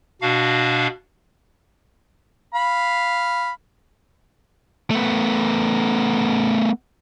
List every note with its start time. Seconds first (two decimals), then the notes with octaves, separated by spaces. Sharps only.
0.22 B2 D4 F#4 F5
2.55 F5 B5
4.91 A3 B3